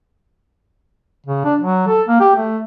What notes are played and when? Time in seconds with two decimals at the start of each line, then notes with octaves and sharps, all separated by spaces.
1.26 C#3
1.45 D4
1.60 F#3
1.88 A4
2.08 A#3
2.20 G4
2.36 A3